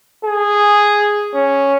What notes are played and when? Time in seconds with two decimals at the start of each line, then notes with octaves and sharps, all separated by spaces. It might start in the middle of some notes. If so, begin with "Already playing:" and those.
0.25 G#4
1.34 C#4